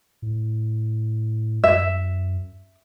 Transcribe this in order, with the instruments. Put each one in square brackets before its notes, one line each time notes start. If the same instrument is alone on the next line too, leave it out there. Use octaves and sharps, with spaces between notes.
[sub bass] A2
[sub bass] F#2 [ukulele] E5